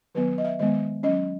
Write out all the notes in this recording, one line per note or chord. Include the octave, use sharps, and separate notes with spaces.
D#3 F#3 B3 B4
D#5
E5
D#3 G#3 B3 D#5
F#3 C#4 D#5